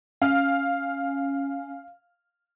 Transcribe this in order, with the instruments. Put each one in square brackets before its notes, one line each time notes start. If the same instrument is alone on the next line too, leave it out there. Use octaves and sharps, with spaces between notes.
[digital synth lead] C#4 [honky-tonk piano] F5 F6